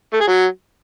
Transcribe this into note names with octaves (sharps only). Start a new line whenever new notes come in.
A3
G#4
F#3